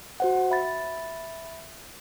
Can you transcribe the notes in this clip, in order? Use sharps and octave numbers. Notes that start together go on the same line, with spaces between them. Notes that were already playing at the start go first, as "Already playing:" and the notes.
F#4 C5 F#5
E5 B5 A6